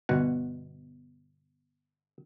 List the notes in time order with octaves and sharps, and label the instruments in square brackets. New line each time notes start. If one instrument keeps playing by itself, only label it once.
[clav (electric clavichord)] G1 B2 F#5